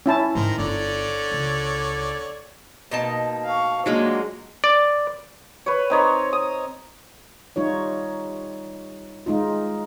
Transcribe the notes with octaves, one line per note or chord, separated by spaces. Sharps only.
C#4 E4 A5
G#2 D#3 G3 C5 A#5
G1 D3 C#5 D5
C#2
B2 A#3 D#4 A5
F5 C#6
F#3 G#3 A#3 D4 F4
D5
B4 C#5
C4 D#4 C#5
D#6
G3 D#4 F4 C#5
G#3 D#4 F4